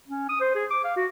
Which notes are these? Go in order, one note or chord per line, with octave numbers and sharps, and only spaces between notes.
C#4
D#6
C5
G#4
D6
F5
F#4